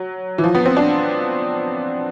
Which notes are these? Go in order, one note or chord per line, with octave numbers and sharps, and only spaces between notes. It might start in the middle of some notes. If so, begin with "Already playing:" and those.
Already playing: F#3
E3
F3
B3
C4
D4